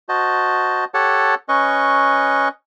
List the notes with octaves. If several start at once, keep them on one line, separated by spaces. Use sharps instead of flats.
F#4 C5 D#5 A5
G4 A4 C#5 F#5 A5
C#4 B4 D#5 C#6